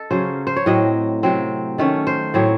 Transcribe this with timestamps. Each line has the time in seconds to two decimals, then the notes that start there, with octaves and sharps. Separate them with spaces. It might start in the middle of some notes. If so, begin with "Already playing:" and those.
Already playing: A4 D#5
0.11 C#3 F#3 C#4 C5
0.47 C5
0.57 C#5
0.66 A2 F#3 C4 D#5
1.23 C3 F#3 C4
1.78 D#3 A3 C#4
2.07 C5
2.34 A2 F#3 C4 C#5